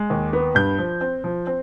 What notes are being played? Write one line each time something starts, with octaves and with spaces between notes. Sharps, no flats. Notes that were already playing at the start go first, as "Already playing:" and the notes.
Already playing: G#3
D#2
B3
G2 G6
F3
C4
F3
C4